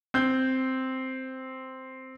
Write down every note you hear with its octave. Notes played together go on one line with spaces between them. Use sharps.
C4 G6